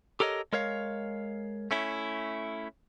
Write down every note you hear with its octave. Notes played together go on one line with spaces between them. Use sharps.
G4 A4 A#4 C#5 D#5
G#3 A#4 C#5 F5
A3 C#4 E4